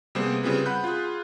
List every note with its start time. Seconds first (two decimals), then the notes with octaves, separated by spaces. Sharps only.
0.15 C3 G3 A#3 B3 G#4 C5
0.43 C#3 G3 C4 F4 G#4 B4
0.65 F#5 B5 F#6 G6
0.84 F4 G#4